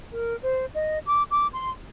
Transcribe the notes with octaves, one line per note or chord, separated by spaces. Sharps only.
A#4
C5
D#5
D6
D6
C6